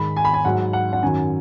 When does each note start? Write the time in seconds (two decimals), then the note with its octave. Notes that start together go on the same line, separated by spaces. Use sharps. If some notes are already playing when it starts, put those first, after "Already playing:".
Already playing: G#2 D#3 G#3 B5
0.16 G#5
0.25 B5
0.34 G#5
0.45 G#2 F#3 F#5
0.73 F#5
0.93 F#5
1.03 F#2 D#3 F#3 G#5